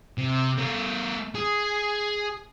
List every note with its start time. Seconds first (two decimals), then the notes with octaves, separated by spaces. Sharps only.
0.18 C3
0.59 A3 A#4
1.35 G#4